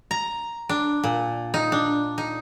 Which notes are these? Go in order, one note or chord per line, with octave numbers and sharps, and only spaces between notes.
A#5
D4
A#2
D#4
D4
D#4